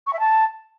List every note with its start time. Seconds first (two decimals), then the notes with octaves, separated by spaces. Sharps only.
0.07 C#6
0.13 E5
0.20 A5